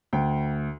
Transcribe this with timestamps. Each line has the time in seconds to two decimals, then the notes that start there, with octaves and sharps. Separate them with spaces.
0.13 D2 G5